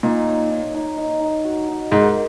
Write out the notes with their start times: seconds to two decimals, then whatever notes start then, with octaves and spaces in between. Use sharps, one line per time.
0.03 A#2 D#4
0.27 C#5
0.50 D#4
0.74 D#4
0.98 D#4
1.20 D#4
1.45 F#4
1.68 D#4
1.91 G#2 A#4